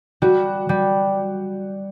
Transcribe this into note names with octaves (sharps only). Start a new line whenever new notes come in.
G3 F#4
G3